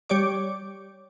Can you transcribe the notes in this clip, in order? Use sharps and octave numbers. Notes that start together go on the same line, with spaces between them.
G3 G4 C#5 D5 D6